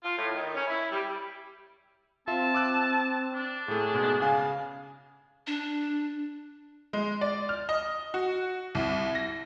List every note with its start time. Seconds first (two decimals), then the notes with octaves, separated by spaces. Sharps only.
0.03 F4
0.18 A2
0.35 D#3
0.54 C#4
0.67 E4
0.91 G3
2.28 C4 F4 E5 A5
2.54 D6 E6 F#6
3.34 D4
3.68 A2 A3 G#4
3.94 G#2 B2
4.22 C#3 F5 G#5
5.47 D4
6.93 G#3
7.21 D5
7.49 F6
7.69 D#5
8.14 F#4
8.75 C2
9.15 A#6